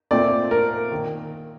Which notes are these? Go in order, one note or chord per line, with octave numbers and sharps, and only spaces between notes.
A#2 A3 C4 D5
A#4
D#3 A#3